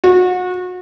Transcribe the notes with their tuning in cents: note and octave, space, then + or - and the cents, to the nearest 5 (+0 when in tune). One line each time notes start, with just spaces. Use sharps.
F#4 -30